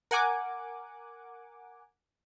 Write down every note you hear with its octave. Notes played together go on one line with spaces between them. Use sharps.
A#4 F#5 G#5 D6